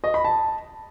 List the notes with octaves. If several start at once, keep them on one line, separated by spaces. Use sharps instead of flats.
D#5
B5
A5